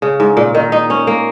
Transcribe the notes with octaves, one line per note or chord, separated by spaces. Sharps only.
C#3
G#2
A#2
D#3
D#4
C#4
A#3